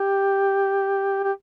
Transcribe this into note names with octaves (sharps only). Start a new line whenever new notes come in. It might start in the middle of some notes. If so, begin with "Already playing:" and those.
Already playing: G4
G4